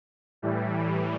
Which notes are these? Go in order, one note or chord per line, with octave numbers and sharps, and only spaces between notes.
A2 E3 G3